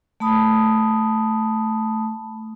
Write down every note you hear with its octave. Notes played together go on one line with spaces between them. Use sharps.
A3 A5 B5 D#6